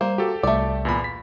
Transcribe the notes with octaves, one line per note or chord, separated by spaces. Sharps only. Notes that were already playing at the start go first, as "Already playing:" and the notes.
G3 A#3 C5
F#4 G4 A4
C2 A3 D5
E2 A#2 B5
B6